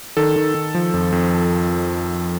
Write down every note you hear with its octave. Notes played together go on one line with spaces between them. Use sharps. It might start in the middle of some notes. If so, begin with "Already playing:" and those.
D#3 A4
D#3
D#3
F3
F2
F2